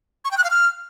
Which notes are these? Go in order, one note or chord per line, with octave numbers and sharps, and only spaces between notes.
C#6
G5
F#6
F5
F6